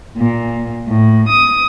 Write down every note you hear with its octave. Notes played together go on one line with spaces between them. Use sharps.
A#2
A2
D#6